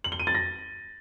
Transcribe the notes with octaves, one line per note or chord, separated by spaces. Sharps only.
F#7
G7
D#7
A6
A#6